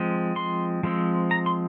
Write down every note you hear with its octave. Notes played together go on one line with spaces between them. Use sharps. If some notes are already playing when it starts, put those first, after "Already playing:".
Already playing: F3 G#3 C4
C6
F3 G#3 C4
A#5
C6